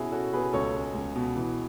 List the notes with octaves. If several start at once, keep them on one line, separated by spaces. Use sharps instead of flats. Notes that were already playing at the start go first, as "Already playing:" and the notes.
Already playing: B2 C#4 E4 F#4 G#4
C#4 F#4 A4
B2 G#4 B4
C#2 A4 C#5
G#3
C#2
B2
E3